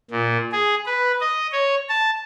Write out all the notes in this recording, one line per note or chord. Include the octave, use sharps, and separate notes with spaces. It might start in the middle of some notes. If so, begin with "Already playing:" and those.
A#2
G#4
B4
D#5
C#5
A5